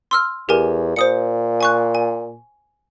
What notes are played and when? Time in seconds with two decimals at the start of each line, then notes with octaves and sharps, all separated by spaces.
0.11 C6 E6 F6
0.49 E2 G4 A#4 G#5
0.96 A#2 C5 D#6 C#7
1.61 G#5 C#6 F#6
1.95 G#5